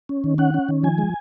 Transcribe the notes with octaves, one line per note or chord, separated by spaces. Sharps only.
C#4
D#3
C#4 F#5
C#4
D#3
F3 G#5
G#3